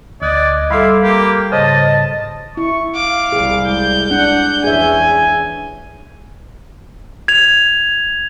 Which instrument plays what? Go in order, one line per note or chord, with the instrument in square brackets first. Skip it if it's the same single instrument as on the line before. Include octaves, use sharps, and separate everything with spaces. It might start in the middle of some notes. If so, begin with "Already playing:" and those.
[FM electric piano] D2 F#6 G#6 [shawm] D5 [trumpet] D#5
[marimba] G3 A4 [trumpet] E4 [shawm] F5 [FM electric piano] B5 C6 D6
[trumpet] A#3 [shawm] G4
[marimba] G#2 C#3 [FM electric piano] C5 [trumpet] D#5 [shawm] A5
[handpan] E4 [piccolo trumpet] C#6
[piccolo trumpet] F5 [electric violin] D6
[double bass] C2 [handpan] G#4
[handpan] G#3 [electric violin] G6
[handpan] D4 [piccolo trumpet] F#5
[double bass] E2 C#4 [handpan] G#4 E5 [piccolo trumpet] G#5
[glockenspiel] G#6 F7